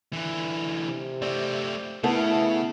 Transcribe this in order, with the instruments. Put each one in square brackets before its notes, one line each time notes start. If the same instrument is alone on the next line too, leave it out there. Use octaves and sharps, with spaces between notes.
[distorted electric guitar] D3 E3
[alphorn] C3
[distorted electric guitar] A3 C4 [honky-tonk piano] D5
[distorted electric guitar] C#3 [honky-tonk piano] A3 B3 A4 [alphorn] E4